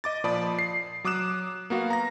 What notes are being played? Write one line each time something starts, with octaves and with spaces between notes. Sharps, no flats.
D#5 D6 A6
A#2 F3 D5 A5 B5 D#6
C7
F#3 D6 D#6 F#6 E7
A#3 B3 F#4 F5
A#5 A#6